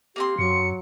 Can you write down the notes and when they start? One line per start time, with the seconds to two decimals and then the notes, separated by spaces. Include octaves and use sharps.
0.16 A#3 C4 G4 C6
0.39 F#2 F#3 C#7